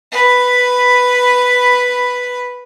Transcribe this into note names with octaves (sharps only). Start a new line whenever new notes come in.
B4 B5